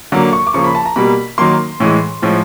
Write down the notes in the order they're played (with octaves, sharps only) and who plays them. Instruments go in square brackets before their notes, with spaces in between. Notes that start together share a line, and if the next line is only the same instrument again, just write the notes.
[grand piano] D3 F#3 A#3
C#6
D6
C#3 F3 A#3 C#6
B5
A5
A#5
B2 G3 A#3 B5
D#3 F#3 A#3 C6
A2 E3 G#3
A2 F3 G#3